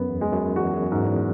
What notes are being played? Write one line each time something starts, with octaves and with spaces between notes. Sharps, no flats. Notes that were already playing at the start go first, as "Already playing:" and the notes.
Already playing: F#2 B3
E2
G#3
F#2
E2 F#4
F#2
G#2
E2